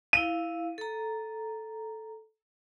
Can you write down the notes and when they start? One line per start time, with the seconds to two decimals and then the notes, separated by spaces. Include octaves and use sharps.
0.13 E4 F5 D#7
0.78 A4 A#5